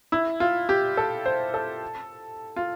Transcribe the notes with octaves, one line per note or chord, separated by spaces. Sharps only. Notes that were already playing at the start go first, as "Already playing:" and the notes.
E4
F4
G4
A4
C5
A4
F4